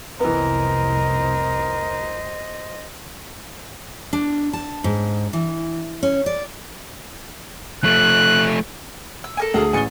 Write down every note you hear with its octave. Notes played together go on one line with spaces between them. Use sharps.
F1 C2 E3 B3 A#4 C5 D#5
D4
A5
G#2
E3
C#4
D5
F3 A3 F#6
E6
A4 A#4 G#5
D2 G#4
A1 G#5 C#6 A6 G7